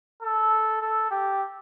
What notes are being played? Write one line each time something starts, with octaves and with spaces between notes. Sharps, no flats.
A4
A4
G4